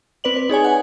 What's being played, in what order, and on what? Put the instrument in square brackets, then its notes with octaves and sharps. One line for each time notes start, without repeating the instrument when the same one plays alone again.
[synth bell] C4 B4 D5 F#7
B4
D#4 G#4 C#5 G#5
F#5 G#5